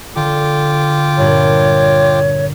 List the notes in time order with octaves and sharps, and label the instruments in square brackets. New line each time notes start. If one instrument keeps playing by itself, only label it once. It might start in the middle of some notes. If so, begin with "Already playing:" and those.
[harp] D3 [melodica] F4 G5 D6
[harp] G2 A#2 D4 [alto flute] C#5